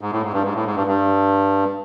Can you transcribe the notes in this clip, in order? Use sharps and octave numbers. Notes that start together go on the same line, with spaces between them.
G#2
A2
G#2
G2
G#2
A2
G#2
G2
G2